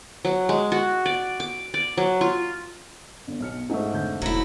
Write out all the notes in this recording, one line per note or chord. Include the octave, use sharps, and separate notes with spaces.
F#3
G#3
F#4
D5
D6
D5
F#3
F4
G1
B1 F6 C#7
G#2 A3 G#4
F1 D3 G6
E1 F#3 E4